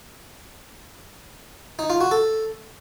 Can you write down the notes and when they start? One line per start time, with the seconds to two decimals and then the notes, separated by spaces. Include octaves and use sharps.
1.79 D#4
1.90 F4
2.01 F#4
2.11 A4